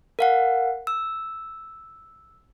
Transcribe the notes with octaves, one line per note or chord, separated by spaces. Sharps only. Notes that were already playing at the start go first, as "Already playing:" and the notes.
A#4 F5 F#5
E6